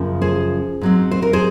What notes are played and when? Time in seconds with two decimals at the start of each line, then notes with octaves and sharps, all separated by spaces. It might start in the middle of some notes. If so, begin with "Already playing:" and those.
Already playing: F#2 C#3 F3 A#3
0.22 G#4 C5
0.81 G#2 F#3 C4
1.11 C5
1.22 A#4
1.33 G#4 C5